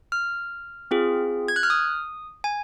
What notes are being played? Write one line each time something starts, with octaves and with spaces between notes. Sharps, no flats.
F6
C4 F4 G#4
G#6
F#6
F6
D#6
G#5